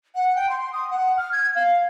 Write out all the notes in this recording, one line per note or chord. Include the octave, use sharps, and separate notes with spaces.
F#5
G5
C6
D#6
F#5
F6
G#6
F5